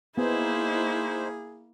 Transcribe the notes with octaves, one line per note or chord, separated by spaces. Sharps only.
A#3 B3 D#4 E4 G#4 C5